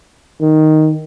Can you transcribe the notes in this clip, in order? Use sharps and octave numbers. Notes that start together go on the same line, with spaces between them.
D#3